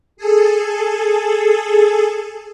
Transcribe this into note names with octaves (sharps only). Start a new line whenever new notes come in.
G#4 A4